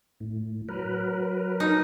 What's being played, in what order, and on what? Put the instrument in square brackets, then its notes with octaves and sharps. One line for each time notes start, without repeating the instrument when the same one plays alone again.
[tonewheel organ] A2
F#3 A#4 B4
[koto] D#4